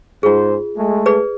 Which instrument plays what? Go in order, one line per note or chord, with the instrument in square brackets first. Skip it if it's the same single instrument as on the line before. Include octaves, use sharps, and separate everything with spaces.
[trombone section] G#2 C5 [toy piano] F4 G#4
[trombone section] G#3 A3
[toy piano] G#4 B4 D5